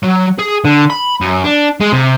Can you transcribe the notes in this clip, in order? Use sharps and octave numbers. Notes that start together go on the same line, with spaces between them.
F#3
G#4
D3
B5
F#2
D4
G#3
C3